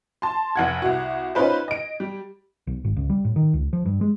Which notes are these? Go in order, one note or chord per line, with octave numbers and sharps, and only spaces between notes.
A5 C6
F1 F#5 G#6
C2 F#4
C#4 D#4 F4 B4 C5
D#5 D7
G3
B1
G#1
C#2
G3
A2
D#3
C#2
F3
G2
G#3